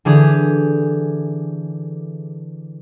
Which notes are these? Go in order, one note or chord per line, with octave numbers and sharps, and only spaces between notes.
D3 E3 G4 G#4